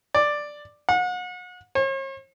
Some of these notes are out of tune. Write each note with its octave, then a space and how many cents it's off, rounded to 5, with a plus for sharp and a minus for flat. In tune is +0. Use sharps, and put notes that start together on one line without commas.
D5 +5
F#5 -35
C#5 -45